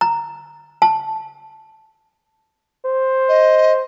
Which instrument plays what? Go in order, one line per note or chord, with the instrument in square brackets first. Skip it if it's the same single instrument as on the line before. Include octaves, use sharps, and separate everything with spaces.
[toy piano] A#5
A5
[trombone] C5
[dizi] D#5